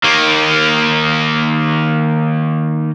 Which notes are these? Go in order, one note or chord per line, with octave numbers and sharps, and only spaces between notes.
D#3 A#3